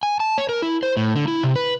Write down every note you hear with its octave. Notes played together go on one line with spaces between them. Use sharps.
G#5
A5
C#5
A#4
E4
C5
A2
D3
E4
C3
B4